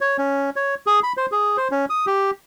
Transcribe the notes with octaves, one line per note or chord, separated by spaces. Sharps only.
C#5
C#4
C#5
G#4
B5
C5
G#4
C5
C#4
D#6
G4